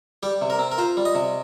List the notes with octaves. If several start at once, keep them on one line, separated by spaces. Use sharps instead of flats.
G3 G4
C3
A#4
C4
A#4
F4 C5
G3
D#5
C3